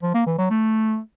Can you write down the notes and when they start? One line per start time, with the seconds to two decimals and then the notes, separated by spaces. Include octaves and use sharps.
0.03 F3
0.15 A#3
0.27 E3
0.38 F#3
0.50 A3